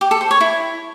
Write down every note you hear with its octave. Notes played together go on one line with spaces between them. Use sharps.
G4
A4
C5
C#5
E4